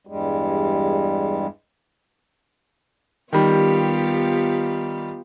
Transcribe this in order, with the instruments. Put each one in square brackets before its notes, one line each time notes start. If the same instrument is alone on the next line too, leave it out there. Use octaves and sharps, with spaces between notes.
[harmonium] E2 G2 G3 G#3
[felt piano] D#3 G3 [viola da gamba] B3 F4 G4